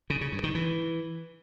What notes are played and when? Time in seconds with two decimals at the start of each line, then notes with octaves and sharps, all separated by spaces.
0.10 C#3
0.21 C#3
0.32 G2
0.44 D#3
0.55 E3